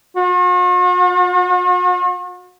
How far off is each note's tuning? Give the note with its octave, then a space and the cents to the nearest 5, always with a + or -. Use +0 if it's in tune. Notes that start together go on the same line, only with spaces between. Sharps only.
F#4 -45